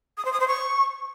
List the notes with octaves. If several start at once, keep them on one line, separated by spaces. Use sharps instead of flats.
D#6
C5
D#6
C5
C#6